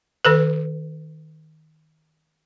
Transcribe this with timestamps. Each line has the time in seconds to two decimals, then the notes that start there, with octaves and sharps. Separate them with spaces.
0.25 D#3 A4 B4